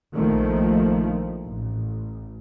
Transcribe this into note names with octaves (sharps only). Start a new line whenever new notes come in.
A#1 D#3 F3 A3 A#3
A1